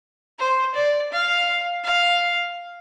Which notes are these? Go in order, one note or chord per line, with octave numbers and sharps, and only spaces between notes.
C5
D5
F5
F5